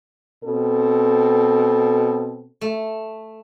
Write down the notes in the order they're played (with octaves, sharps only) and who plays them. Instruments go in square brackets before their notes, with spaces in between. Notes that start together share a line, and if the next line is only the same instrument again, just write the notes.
[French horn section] B2 C4 A4
[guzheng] A3